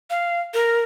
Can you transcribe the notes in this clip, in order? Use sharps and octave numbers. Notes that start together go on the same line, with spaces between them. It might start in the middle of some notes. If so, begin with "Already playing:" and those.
F5
A#4